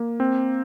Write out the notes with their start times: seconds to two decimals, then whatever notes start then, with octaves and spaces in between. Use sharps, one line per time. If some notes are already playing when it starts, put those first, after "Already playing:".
Already playing: A#3
0.20 C4